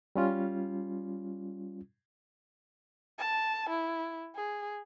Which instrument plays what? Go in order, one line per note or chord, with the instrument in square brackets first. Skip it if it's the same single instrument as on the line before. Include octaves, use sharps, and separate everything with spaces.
[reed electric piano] G3 C#4 F4
[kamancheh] A5
E4
G#4